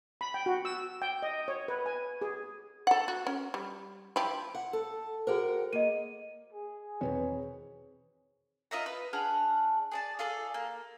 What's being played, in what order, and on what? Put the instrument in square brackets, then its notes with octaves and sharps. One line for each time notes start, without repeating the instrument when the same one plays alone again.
[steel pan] B5
G5
F#4
E6
G5
D#5
C#5
B4
G#5
G#4
[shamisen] A4 F#5
F#4
C#4
G3
F3 E4 G4
[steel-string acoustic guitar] F#5
A4
[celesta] F#4 G#4 C5 [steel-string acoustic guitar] A#4 F#5 G5
[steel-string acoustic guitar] A#3 [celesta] D#5 D#7
[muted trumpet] G#4
[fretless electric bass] E2 B2 D#3 [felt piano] C4 B4 C#5
[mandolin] F4 D#5 E5 A#5
B4
D4 G#4 F#5 F6
G#4 D5 A5
F4 G#4 A4 D5
A#3